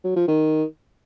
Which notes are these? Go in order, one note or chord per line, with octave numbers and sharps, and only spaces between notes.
F#3
F3
D#3